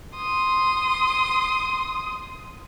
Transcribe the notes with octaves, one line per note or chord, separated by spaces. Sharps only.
C6 D#6